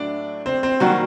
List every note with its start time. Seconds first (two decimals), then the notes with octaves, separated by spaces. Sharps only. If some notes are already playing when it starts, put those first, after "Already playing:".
Already playing: A2 F#3 A3 D4 D5
0.46 C4 C5
0.63 C4 C5
0.80 D#3 F#3 G3 A#3 F#4